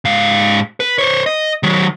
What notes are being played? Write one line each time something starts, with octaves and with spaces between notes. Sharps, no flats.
G#2 F5
B4
C5 C#5
D#5
D#3 F#3